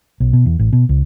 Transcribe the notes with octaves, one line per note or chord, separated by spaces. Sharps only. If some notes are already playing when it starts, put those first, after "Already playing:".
B1
B2
E2
A1
B2
C#2